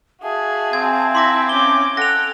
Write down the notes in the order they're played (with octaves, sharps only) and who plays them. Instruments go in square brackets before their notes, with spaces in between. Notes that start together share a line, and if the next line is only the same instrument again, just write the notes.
[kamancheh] F#4 G#4 [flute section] E5 F5 A5
[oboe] C4 [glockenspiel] G#5 G#6
[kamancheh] E4 [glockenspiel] C6 D6 A#6
[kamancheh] C#4 D6 [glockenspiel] G7
[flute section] A4 [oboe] F#5 [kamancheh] G5 [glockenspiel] A#6 F7